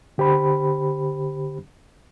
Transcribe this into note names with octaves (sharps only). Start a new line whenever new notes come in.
D3 G4 C5 B5